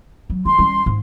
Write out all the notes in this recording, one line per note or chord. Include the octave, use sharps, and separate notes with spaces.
F#3
D#3 C6
G3 C#4
G#2